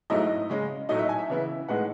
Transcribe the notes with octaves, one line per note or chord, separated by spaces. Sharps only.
G#2 F#3 A3 E4 D#5
C#3 G#3 C#4
A2 F#3 A3 D#4 D#5
E5
G#5
E5
C#3 E3 B3 E4
A2 G#3 B3 D#4 F#5